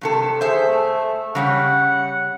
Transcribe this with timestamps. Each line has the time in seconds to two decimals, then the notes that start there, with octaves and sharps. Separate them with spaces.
0.01 G2 C3 A4
0.41 G#4 C5 E5
0.67 A3
1.35 C#3 G3 C#4 F#5